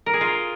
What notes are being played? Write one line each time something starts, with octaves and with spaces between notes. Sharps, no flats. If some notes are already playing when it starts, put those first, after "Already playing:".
A#4
G#4
F4